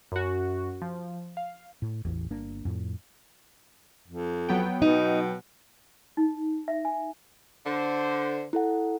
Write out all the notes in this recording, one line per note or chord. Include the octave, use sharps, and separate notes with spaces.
F#2 F#4
F3
F5
A2
A1 E2
G1 A#3 D4
F2 A2
F2
F#3 B3 G5
B2 D#4
D#4
E5
G#5
D3 C5
E4 A4 F#5